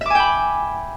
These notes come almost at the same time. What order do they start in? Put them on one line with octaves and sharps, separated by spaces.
E5 D6 G#5 G5 B5